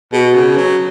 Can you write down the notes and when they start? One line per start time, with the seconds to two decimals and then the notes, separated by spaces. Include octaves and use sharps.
0.12 B2 F#4 G#4
0.35 C#3
0.57 F#3